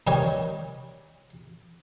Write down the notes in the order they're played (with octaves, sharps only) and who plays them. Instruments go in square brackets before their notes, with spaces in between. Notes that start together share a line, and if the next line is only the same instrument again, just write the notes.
[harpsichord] G2 C3 D#3 G3 G4 C#5